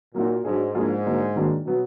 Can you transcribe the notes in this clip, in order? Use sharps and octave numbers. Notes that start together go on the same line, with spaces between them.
A#2 F#3 A#3 D#4 F#4
G#2 F#3 D4 G#4
G#2 F3 A#3 D4 F4 G#4
D3 F#3 A#3 D4
D#3 F#3 A#3 D4
B2 F#3 B3